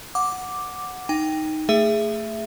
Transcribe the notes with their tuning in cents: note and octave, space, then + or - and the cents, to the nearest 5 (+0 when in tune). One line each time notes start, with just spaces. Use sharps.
F#5 -5 D6 +0
D#4 +0 G5 +10
A3 +20 G#4 +0 E5 +15